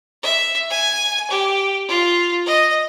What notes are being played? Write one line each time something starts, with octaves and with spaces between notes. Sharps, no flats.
E5
G#5
G4
F4
D#5